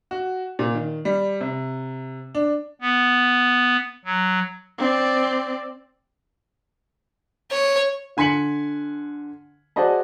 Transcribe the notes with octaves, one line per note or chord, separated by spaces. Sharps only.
F#4
A#2
D#3
G3
C3
D4
B3
F#3
C4 D5
C#5
D3 G#5 C6 B6 C#7 F#7
F#4 G#4 C5 D5 D#5 A5